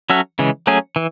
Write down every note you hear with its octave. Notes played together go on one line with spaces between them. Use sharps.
F#3 C#4 F#4 A4 E5
C#3 E3 G#3
F#3 A3 C#4 G#4
E3